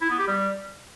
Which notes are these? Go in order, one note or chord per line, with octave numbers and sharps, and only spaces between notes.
E4
B3
G4
G3